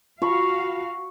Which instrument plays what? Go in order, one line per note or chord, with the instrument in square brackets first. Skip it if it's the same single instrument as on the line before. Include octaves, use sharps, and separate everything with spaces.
[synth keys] F4 A5 B5 [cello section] F#4 F5 [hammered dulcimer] C#6